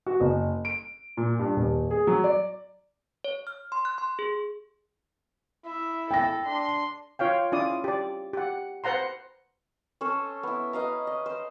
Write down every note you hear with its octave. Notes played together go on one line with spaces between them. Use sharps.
F#4
F#1
D7
A#2
G2
D#1
G#4
F#3
D5
C#5
F6
C6
F#6
C6
G#4
E4 E5
A4 G5 A#6
D4 C6
F4 C#5 F5 G5
C#4 E4 F4 D5 D#6
G4 D5
G4 F#5
B4 C5 F#5 A#5 C6
C#4 A4 C5
B3 E4
B4 D#5 F5 A#5
D#5
C5